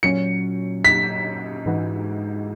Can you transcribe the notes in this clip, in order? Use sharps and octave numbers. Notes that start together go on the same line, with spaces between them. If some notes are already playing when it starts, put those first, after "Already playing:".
A#2 F#3 C#4 C#7
B6
G#2 E3 G#3 D#4 F#4